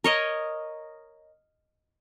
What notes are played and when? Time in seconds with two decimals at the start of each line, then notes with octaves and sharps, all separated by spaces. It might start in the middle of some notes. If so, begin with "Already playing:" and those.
0.04 A#4 C#5 D#5